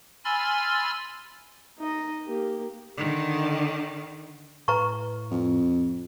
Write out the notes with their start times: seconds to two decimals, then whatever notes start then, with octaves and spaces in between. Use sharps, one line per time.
0.25 G#5 B5 C6 E6 F6 A6
1.78 D#4 D#5
2.25 A#3 G4
2.97 D3 D#3
4.68 A2 B4 A#5 C#6
5.31 F2